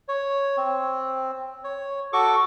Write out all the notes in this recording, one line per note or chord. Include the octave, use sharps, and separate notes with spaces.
C#5
C4
C#5
F#4 A4 C#6 D6